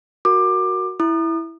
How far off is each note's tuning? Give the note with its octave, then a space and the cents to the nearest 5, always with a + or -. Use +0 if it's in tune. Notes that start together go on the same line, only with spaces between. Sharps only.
F#4 +0 A#4 +0 D6 +20
E4 +0 D#6 -40